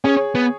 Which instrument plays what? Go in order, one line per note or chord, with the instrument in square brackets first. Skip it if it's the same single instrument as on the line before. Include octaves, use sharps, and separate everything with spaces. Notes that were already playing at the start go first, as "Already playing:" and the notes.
[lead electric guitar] C#4 [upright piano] G#4 C#5
[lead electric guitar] B3